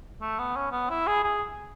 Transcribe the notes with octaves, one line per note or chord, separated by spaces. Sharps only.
A3
B3
C#4
B3
E4
G#4
G#4